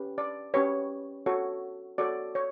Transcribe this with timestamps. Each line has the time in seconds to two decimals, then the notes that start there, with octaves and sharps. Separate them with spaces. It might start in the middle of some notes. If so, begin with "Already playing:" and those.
Already playing: C#4 G4 B4
0.18 D5
0.54 C#4 G4 B4 C#5
1.26 F#4 A4 C#5
1.98 F#4 A4 C#5 D5
2.35 C#5